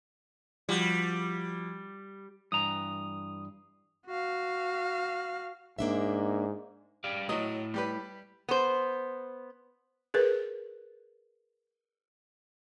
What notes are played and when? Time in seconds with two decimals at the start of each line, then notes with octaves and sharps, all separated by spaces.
0.69 F3 G3 F#4
2.52 G2 E3 A#5 D#6
4.07 F#4 F5
5.79 G#2 A#3 D4 E5
7.04 G4 D5 F5
7.29 F#3 A3 E4 D#5
7.74 G3 G4 B4
8.49 B3 C5
10.14 G#4 A#4 B4